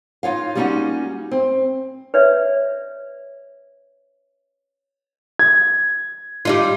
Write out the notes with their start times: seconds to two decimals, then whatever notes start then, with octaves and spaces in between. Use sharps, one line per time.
0.23 D#4 F4 C#5 F5
0.55 G3 A#3 C#4 D#4 F4 F#4
1.31 C4
2.14 B4 C#5 D5 E5
5.39 G#6
6.45 G3 D#4 F4